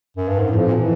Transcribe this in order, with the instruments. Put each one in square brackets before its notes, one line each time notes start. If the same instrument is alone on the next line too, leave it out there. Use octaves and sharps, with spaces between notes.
[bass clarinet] F#2
G2
G#2
[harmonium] F2 F3 [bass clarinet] A2
[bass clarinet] A#2
[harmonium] E3